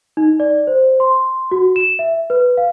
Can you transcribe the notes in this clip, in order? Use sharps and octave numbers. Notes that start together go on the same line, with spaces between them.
D#4
D5
C5
C6
F#4
E7
E5
B4
F5